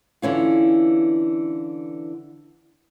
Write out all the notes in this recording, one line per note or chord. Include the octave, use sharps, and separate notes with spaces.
D3 E3 C#4 F4